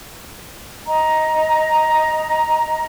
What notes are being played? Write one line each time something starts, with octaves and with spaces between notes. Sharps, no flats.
D#5 A#5